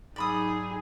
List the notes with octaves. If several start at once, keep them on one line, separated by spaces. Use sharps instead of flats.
G#2 F#3 D#4 G#4 D5 B5 D#6 E6